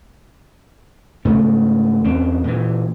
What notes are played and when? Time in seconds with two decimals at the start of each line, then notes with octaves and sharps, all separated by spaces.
1.25 G#2 C#3 A3 C#4
2.04 E2 C4 C#4
2.44 A#2 E3